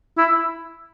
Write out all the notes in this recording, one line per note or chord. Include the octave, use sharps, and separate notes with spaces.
E4